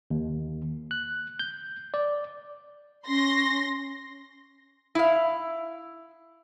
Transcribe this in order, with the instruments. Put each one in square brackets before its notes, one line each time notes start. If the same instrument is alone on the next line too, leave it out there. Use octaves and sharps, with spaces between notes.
[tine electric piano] D#2
F#6
G6
D5
[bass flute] C#4 [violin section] C6 A#6
[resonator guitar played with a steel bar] E4 F5